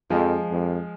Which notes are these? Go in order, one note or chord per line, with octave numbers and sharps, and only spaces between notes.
F2 F3 G#3
F2